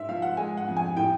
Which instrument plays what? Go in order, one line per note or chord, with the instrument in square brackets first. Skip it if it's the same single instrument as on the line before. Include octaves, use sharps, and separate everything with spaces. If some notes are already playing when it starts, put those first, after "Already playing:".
Already playing: [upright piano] G#2 E5
F3 F5
F#5
G#3 G#5
F#5
F2
G#5
A2 G5